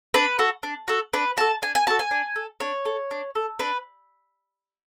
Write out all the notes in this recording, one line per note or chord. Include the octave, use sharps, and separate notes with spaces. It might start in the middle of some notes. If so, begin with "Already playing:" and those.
D4 B4
F#4 A4
D4
F#4 A4
D4 B4
F#4 A4 A5
D4 G#5
G#5
F#4 A4 A5
G#5
D4
A4
D4 C#5
A4
D4
A4
D4 B4